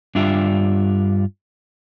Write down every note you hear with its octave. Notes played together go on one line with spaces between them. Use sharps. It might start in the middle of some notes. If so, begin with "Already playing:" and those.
G2 D4 F4 G4 E5